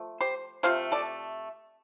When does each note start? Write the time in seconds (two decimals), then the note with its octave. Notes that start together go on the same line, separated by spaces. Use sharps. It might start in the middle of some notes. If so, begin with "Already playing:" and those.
Already playing: F3 A3
0.21 G4 C5
0.63 C3 A3 F4 C5 F5
0.92 A4 D5